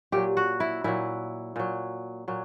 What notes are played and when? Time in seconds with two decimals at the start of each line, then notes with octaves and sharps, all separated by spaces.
0.12 A#2 F#3 G4
0.37 F#4
0.60 E4
0.84 A#2 F#3 E4
1.56 A#2 F#3
2.28 A#2 F#3